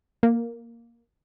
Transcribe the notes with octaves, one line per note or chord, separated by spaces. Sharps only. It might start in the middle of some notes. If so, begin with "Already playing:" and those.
A#3